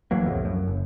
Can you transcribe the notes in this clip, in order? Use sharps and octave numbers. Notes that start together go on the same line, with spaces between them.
D#2 E3 F#3 A#3
C2 F2 A2
F#2
F#1